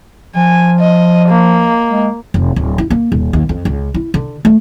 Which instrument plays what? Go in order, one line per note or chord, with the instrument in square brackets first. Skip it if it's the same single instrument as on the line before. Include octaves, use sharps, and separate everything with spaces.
[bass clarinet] F3 [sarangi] G#5
[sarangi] D#5
A#3
[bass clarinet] G#3
[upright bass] F1
D1
E4
A#3
D#1
D#2
F2
C#2
E4
D3
A3